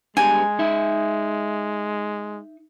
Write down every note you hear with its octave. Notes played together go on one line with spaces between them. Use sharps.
G#3 D4 G4 G#5 A#5
D#4 E5